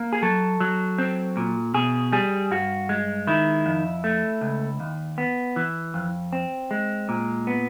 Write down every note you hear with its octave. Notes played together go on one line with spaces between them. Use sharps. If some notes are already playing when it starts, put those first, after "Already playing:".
Already playing: A#3 A#4
G#4
F#3 A4
F#3
C4
A#2
B2 G#4
G3 G#4
G2 F#4
G#3
D#3 E4
F2
A3
C#2
D#2
B3
E3
F2
C4
G#3
A#2
B3